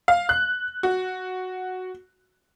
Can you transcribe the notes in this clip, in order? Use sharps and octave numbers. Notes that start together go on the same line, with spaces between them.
F5
F#6
F#4